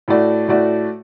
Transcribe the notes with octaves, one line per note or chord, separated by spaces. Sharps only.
A2 A3 F#4 D5
A2 A3 F#4 D5